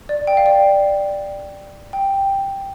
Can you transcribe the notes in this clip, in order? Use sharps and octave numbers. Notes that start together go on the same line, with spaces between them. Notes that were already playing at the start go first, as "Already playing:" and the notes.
D5
G5
F5
D5
G5